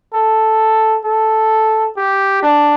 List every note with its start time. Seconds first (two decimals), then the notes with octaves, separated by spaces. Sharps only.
0.14 A4
1.05 A4
1.97 G4
2.43 D4